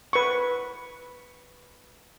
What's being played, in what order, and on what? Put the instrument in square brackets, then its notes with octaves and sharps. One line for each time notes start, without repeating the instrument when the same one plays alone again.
[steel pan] B4 C#6